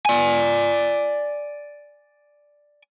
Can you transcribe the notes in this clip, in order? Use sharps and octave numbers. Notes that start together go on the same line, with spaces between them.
D5 G#5